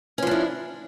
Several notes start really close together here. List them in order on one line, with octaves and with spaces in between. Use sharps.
C#4 F3 D4 E4